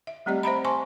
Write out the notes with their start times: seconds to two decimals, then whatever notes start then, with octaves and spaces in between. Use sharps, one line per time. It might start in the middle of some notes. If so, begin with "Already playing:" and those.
0.07 E5
0.26 G3 A3 C4 G4 D5 D#5
0.43 C5 E5 A#5 B5
0.64 C5 G#5 A5 C6 C#6